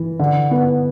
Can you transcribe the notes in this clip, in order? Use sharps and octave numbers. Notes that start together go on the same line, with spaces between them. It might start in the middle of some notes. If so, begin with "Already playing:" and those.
Already playing: E3
D3
B3